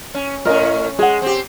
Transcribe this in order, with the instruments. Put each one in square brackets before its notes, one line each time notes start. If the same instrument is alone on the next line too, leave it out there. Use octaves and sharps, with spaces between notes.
[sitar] C#4
[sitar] A2 C#4 [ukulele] A#4 D#5
[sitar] G#3 [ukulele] G#4 F#5
[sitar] C4 G4